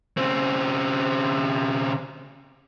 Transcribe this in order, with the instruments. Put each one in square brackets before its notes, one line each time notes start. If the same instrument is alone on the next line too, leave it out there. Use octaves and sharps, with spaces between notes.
[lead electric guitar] C#3 C4